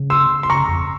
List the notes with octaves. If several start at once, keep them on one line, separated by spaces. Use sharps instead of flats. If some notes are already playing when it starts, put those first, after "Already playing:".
Already playing: C#3
C6 E6
C6
C#3 A#5 C#6
F2